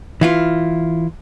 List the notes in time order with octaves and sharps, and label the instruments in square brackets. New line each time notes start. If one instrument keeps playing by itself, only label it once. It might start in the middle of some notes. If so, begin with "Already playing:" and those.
[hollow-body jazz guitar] E3 E4 F4